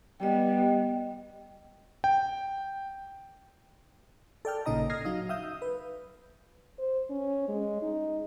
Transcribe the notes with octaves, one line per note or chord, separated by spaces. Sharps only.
G3 B3 D#5 G5
G5
A4 D5 G5 F6
A1 A#2 C#3 D#4 D#5 A#5
D#6 F6 G#6 A#6 C7
F#3 D#4 F5 D#6
E5 F5 D#6 G6
B4
C5
C#4
G#3
D#4